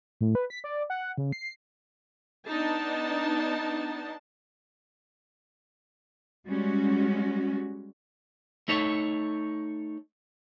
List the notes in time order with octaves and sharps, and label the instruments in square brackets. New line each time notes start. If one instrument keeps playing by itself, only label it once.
[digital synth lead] A2
B4
B6
D5
F#5
C#3
C7
[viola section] B3 D4 D#4 A5
[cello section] G3 G#3 C#4 F#4
[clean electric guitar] A3 D#4 A4 C#5